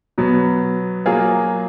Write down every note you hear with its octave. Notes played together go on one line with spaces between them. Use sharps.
B2 F#3 B3
F#3 A#3 F4 G#4